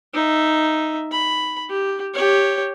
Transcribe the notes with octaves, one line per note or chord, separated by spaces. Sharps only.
D#4 E5
B5
G4
G4 C#5